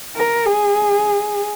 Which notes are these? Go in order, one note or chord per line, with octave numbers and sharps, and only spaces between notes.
A#4
G#4